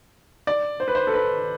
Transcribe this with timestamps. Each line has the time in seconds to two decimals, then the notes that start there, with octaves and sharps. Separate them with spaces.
0.47 D5
0.80 C5
0.88 B4
0.95 C5
1.07 A4
1.14 B4